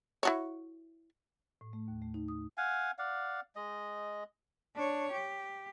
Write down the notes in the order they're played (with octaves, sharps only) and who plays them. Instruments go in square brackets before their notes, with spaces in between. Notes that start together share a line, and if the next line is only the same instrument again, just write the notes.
[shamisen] E4 F#4 C#5
[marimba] A2
A3
D#2
A3
D#4
D#6
[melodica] F5 F#5 G#5
D5 F5 F#5
G#3 D#5
[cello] D4 C#5
G4